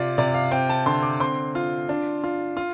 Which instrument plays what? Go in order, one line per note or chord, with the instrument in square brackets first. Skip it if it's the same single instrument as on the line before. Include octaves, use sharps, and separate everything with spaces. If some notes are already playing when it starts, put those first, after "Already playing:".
Already playing: [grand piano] C3 F4 D5
C3 D5
F5
C4 G5
A5
D3 C6
D6
C4 C6
F4
D4
F4
F4